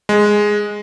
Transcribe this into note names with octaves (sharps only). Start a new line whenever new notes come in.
G#3